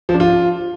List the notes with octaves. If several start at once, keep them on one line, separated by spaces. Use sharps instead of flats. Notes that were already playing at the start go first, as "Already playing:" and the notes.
F3
D4
F4